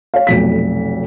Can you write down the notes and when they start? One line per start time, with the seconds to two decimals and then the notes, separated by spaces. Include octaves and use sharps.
0.14 C#5 F5
0.27 F1 B1 F2 B6